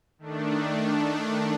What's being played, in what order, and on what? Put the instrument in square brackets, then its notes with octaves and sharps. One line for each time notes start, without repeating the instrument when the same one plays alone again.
[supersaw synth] D#3 A3 D4